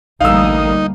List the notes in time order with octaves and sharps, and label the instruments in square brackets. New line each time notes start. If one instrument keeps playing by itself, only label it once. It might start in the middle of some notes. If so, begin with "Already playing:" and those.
[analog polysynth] A1 D#6 [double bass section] D2 G3 A#3 [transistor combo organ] D#4 [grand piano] F5 E6